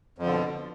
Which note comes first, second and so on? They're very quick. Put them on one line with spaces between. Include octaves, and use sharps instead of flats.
F2 F3 D3 B2